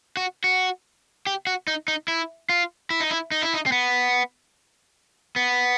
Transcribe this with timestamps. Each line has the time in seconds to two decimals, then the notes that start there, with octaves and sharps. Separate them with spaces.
0.17 F#4
0.44 F#4
1.27 G4
1.47 F#4
1.67 D#4
1.88 D#4
2.08 E4
2.49 F4
2.90 E4
3.00 D#4
3.11 E4
3.32 D#4
3.42 E4
3.54 D#4
3.66 C4
3.72 B3
5.36 B3